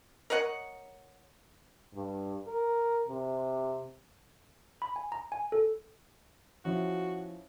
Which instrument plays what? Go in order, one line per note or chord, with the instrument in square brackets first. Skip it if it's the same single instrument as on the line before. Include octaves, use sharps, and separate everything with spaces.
[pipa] A#4 C#5 D#5 F#5
[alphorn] G2
A#4
C3
[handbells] B5
G#5
A#5
G#5
A4
[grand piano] F3 C#4 E4 [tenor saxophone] F#4